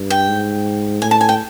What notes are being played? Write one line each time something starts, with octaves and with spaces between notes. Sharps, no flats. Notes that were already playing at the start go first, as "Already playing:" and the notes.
Already playing: G2
G5
G#2
A2 G#5
A5
G#5
G5